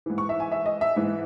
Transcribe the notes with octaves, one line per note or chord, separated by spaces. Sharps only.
G#2 E3
C#6
E5
G#5
E5
D#5
E5
G#2 E3